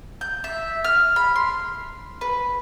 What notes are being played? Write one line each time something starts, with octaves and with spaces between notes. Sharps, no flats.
G6
E5
F6
B5
C6
B4